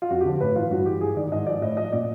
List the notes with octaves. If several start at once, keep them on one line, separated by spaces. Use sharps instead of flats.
F4
F2 F#4
G4
D3 F3
A2 B4
E3 F4
G2 F#4
E3 G4
G#2 G#4
D#3 D5
G#2 D#5
F3 D5
A2 D#5
F3 D#5
A#2 D5